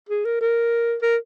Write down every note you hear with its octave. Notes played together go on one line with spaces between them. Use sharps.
G#4
A#4
A#4
A#4